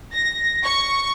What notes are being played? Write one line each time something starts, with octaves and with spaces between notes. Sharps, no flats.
A#6
C#6